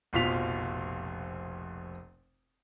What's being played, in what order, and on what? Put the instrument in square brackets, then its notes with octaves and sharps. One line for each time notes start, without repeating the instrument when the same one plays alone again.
[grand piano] F1 A#1 B2 F4 B6 F7